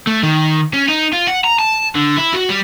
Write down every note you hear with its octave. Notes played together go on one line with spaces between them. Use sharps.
A3
D#3
C#4
D#4
F4
F#5
A#5
A5
D3
E4
F#4
G3